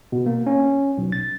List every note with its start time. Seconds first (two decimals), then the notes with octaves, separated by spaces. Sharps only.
0.12 B2
0.26 A#3
0.47 C#4
0.98 B1
1.12 A6